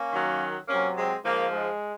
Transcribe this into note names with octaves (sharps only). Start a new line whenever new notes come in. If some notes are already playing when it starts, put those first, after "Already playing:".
Already playing: A#3 C#4
F#2 D#3 F#3
C3 F#3 A#3 C#4
G#3 C4
G#2 F3 A#3
G#3